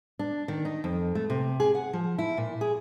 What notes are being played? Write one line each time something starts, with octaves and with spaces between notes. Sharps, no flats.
D4
D#3
D#4
F2
A3
C3
G#4
F#5
F3
E4
A#2
G#4